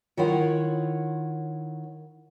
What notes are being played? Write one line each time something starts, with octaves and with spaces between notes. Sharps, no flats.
D#3 E4 F4 C#5 F#5